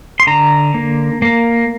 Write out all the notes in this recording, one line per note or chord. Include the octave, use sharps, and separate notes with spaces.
C6
D3 A#5
A#3
A#3